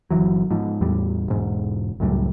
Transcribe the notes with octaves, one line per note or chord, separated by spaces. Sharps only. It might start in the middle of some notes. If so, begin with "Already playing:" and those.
G1 E2 E3 F#3
G#2 F3
E2 A2 G3
E1 G#2
C#2 F#2 A2 G3